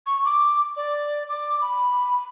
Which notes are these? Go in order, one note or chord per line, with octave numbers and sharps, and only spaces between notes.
C#6
D6
D5
D6
B5